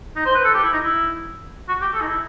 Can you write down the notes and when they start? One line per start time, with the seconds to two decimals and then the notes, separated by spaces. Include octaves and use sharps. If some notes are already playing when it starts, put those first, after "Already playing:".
0.16 D#4
0.25 C5
0.35 B4
0.44 A4
0.54 G4
0.63 E4
0.72 D#4
0.83 E4
1.68 F#4
1.81 G4
1.94 A4
2.01 D#4
2.06 E4